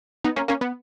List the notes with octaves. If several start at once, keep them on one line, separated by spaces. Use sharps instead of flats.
B3 D#4
A#3 C#4
A#3 C#4
B3